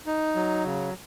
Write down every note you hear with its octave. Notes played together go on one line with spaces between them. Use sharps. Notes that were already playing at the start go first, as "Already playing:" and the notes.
D#4
F#3
C#3